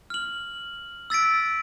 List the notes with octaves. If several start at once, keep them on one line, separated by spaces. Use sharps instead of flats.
F6 F#7
E6 A6 B6 D7